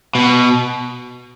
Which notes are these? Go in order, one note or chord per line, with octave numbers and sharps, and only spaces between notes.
B2